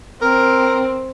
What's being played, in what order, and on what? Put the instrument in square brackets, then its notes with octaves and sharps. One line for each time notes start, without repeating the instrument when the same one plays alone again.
[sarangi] C4 [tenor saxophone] A#4